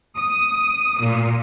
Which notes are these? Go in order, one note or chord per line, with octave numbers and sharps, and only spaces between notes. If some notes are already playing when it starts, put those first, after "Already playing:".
D#6
A#2